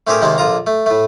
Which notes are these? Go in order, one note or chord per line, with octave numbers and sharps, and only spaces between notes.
A3 C4 D4 G4 G#4 A#4
D#2 C3 D#3 G#3 A#3 C4
A#1 D3 F4 A#5
A3
A2 A3